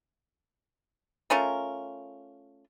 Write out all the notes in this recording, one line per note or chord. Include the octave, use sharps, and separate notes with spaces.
A3 C#4 F4 A#4